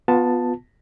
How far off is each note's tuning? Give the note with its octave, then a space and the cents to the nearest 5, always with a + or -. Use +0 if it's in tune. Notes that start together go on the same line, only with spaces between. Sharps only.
B3 +0 F4 +25 A5 +5